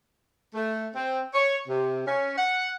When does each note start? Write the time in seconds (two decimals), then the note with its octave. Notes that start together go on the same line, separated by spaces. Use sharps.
0.55 A3
0.95 C4
1.34 C#5
1.68 C3
2.07 C#4
2.38 F#5